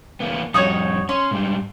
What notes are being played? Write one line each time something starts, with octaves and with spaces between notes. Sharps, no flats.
E2 A#3 B3
F2 G3 D#4 F#4 C#5
C#4 C6
G#2 G3